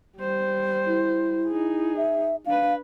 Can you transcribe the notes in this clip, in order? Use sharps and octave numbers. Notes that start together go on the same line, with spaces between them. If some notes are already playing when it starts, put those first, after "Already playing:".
G3 C5
E4
D#4 G#4
E5
D4 B4 F5